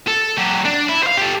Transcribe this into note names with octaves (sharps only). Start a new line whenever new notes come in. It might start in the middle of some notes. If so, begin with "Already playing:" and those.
A4
F#3 G4
D4
E4
C5 F5
G4 A4